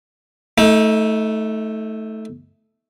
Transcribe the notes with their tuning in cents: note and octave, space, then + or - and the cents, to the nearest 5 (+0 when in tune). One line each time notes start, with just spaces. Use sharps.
A3 +0 D#4 +35